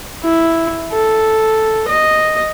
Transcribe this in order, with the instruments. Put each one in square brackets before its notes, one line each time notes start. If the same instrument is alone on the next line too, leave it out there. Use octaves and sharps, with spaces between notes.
[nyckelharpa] E4
A4
D#5